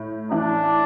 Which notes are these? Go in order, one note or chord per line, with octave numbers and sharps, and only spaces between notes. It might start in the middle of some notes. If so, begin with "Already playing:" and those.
Already playing: A2
E3 D4